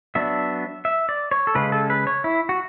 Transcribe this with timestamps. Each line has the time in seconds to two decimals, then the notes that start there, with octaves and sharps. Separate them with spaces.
0.15 F#3 B3 D4 E5
0.85 E5
1.09 D5
1.31 C#5
1.47 A4
1.55 C#3 G#3 C#4 B4
1.72 A4
1.90 B4
2.07 C#5
2.24 E4
2.49 F#4